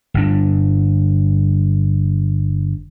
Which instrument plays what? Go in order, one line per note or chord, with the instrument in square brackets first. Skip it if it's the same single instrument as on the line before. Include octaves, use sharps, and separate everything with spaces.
[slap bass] G1 G2 D4